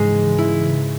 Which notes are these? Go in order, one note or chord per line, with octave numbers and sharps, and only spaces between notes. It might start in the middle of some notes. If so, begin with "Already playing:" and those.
Already playing: G#2 C#3 E3 G#3
E4